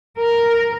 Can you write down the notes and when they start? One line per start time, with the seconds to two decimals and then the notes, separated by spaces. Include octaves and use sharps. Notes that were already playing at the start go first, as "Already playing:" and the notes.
0.18 A#4